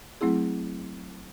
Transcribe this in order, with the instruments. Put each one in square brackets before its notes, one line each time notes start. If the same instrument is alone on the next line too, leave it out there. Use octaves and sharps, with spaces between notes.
[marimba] F#3 A3 C4 E4 G#4